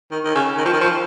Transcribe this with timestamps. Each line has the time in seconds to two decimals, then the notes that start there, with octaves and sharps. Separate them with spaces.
0.11 D#3
0.24 D#3
0.35 C#3
0.58 D#3
0.65 F3
0.73 D#3
0.81 F3